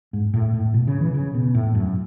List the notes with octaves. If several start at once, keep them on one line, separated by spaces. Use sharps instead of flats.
G#2
A2
A2
B2
C#3
E3
C#3
B2
A2
F#2